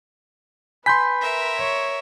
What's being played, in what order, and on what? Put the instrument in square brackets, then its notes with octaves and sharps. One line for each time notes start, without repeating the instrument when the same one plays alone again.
[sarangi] B4 [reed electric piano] G#5 B5 G6 [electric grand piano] C6 B6
[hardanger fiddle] A#4 E5
[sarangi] C#5